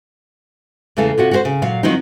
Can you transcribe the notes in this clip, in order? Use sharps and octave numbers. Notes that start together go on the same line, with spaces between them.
E2 C#3 E3 A3 A4 F5
C3 F4 F#4
F#4 G4 C5
C#3
A#2 F#3 F5
D#3 F3 F#3 C4 D#4